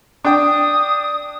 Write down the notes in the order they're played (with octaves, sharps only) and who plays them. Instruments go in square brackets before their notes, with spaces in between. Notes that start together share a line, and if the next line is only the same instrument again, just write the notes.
[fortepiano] D4 G5 [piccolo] D#6